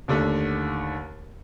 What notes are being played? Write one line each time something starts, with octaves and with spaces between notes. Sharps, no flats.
D#2 D3 A3